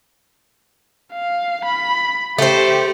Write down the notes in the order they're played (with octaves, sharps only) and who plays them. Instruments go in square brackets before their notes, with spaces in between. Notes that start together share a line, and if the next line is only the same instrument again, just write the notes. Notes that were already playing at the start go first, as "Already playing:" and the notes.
[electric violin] F5
B5
[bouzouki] A3 C5 [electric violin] G4